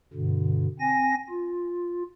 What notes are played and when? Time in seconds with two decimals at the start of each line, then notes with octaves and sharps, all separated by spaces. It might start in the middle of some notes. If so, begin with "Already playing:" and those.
0.13 G2 B2 D3
0.80 C4 G#5 A#6
1.30 F4